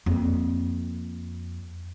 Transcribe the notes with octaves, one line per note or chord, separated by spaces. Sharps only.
F2 A#3